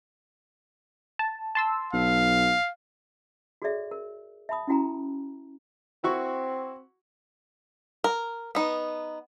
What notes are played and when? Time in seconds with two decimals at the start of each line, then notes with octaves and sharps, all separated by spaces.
1.19 A5
1.55 A5 C6 E6
1.93 B1 F5
3.62 F#4 G#4 A4 C#5 D5 E5
3.91 A#4
4.49 E5 A5 B5 D#6
4.68 C#4 E4 F#4 G5 A#5
6.04 C4 E4 F#4 C#6
8.04 A#4
8.55 B3 D#4